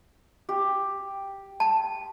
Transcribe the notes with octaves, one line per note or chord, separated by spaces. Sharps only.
G4
A5